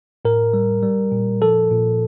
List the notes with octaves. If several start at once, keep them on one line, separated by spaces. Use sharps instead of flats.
A2 A#4
G3
G3
A#2
F3 A4
A#2